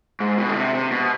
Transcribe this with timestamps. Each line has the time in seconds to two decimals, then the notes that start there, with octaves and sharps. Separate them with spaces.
0.20 G#2
0.38 B2
0.48 D3
0.56 C3
0.75 C3
0.91 B2